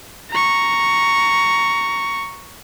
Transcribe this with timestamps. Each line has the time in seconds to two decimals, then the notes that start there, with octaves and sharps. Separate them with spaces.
0.30 A#5 C#6